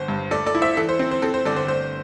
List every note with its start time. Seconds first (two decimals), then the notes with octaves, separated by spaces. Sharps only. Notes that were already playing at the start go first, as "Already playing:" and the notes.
Already playing: G1 C5
0.08 G2
0.31 A3 A4 D5
0.46 A4 D5
0.55 E4
0.62 C5 E5
0.77 E3 A4
0.89 C5
0.99 C4
1.11 C5
1.22 C4 A4
1.34 C5
1.45 G1 A4 D5
1.56 C5
1.68 A3 C5